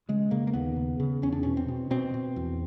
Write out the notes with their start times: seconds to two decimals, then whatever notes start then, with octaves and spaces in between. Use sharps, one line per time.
0.09 C#3 G#3
0.31 C#3 A#3
0.47 A#3
0.53 D#2 B3
0.76 C#3
1.00 C#3
1.22 E2 C#4
1.32 D4
1.43 B2 C#4
1.57 C4
1.68 B2
1.91 B2 C4
2.14 B2
2.36 E2